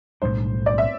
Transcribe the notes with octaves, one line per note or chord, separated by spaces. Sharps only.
B1 A2 G3 D4 C5
D5
E5